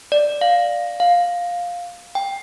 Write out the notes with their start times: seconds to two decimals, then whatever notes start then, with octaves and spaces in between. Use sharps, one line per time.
0.12 D5
0.41 F5
1.00 F5
2.15 G5